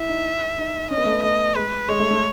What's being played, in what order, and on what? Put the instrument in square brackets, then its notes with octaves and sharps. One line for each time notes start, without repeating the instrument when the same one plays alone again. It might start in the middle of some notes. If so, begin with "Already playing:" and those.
Already playing: [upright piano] E4 [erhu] E5
[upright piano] D#4
D#4
[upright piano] C#4 [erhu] D#5
[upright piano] B3
A3
B3
[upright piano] A3 [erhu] D#5
[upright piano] G#3 [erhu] B4
[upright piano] G#3 [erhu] C#5
[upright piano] A3
A3